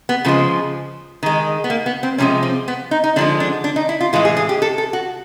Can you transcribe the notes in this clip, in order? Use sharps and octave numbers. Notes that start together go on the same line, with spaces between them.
B3
C#3 F3 G#3 A#3
D#3 G#3
B3
A#3
B3
C4
C3 F3 G#3 C#4
C4
B3
D#4
D#4
D3 F3 G#3 D4
D4
D4
D#4
E4
F4
A2 E3 G#3 F4
G#4
G#4
G4
A4
A4
F#4